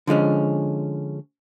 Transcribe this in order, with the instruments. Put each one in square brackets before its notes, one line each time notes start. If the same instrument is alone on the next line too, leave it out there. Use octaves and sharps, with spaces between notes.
[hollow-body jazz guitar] D3 F3 G#3 C#4